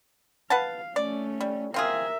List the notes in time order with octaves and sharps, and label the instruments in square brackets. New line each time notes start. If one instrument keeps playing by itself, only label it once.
[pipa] B4 F#5 A5 [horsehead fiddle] F5
[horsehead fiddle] A3 C#4 [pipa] D5
[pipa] G3
[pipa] C4 F4 G#4 [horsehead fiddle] A#4 E5